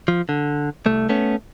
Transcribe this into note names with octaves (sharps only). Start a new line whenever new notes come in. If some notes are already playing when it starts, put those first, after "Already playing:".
F3
D3
C2 A3
A3 B3 C#4